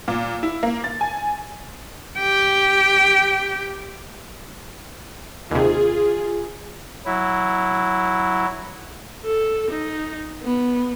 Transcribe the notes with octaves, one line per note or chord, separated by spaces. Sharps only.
A#2
E4
A#3
A6
G#5
G4 G5
D#2 C3 F4 G#4
F#3 E4
A4
D#4
B3